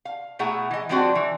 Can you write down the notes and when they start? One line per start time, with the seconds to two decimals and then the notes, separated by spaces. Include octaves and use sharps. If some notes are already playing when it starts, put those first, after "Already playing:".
0.05 F5
0.39 B2 A3 E4 G#4 F#5 A#5
0.71 E3 D#5
0.89 F3 G#3 C4 D4 F#4
1.15 E3